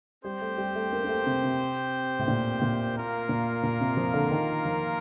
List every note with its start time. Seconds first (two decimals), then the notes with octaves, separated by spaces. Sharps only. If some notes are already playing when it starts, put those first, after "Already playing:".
0.24 G3 C4 G4 C5
0.41 A3
0.58 G3
0.75 A3
0.93 A#3
1.05 A#3
1.09 A3
1.26 C3
1.43 C3
2.19 A2
2.28 A#2
2.62 A#2
2.95 A#3 F4 A#4
3.29 A#2
3.63 A#2
3.81 C3
3.97 F3
4.14 D3
4.31 D#3
4.65 F3